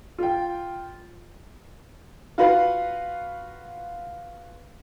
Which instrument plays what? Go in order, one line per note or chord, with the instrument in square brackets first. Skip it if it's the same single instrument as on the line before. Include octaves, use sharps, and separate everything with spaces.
[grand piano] F4 G5
[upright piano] F4 F#4 B4 F5